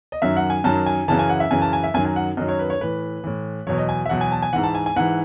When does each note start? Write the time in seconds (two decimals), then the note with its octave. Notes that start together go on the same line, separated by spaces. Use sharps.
0.12 D#5
0.22 F#2 D#3 F#3 E5
0.37 F#5
0.50 G#5
0.64 F#2 D#3 F#3 A5
0.86 G#5
1.08 F#2 C#3 E3 A5
1.19 G#5
1.29 F#5
1.40 E5
1.51 F#2 C#3 E3 G#5
1.62 A5
1.73 G#5
1.84 E5
1.94 F#2 D#3 F#3 G#5
2.05 G#5
2.16 F#5
2.37 F#2 D#3 F#3 D#5
2.48 C#5
2.59 B4
2.70 C#5
2.81 A2 E3 B4
3.24 A2 E3
3.67 E2 B2 F#3 C#5
3.78 D#5
3.89 G#5
4.06 E5
4.09 E2 B2 F#3 F#5
4.21 G#5
4.32 A5
4.42 G#5
4.53 G#2 E3 F#5
4.63 A5
4.75 G#5
4.86 G#5
4.96 G#2 E3 F#5